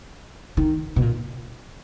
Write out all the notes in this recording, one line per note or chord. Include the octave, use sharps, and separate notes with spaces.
D#3
B2
A#2